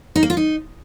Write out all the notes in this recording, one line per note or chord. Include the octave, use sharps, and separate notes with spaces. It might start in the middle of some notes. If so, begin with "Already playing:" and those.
D#4
A#3
F4
D#4